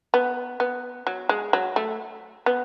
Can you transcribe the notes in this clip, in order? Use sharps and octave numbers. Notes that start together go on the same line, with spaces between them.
B3
B3
F#3
G#3
F#3
A3
B3